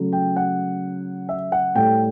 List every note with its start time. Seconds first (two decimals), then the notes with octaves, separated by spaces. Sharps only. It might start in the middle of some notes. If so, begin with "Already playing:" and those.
Already playing: C#3 F#3 A3
0.13 G5
0.36 F#5
1.29 E5
1.52 F#5
1.75 A2 G3 G5